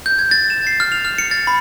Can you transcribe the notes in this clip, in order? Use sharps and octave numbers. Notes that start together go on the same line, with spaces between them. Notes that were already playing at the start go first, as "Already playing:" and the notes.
G6
G#6
A6
E7
C7
F6
F7
F6
C#7
A6
B5